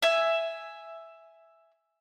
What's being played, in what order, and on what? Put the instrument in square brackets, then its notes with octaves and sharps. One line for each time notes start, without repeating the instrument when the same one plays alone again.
[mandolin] E5 G#5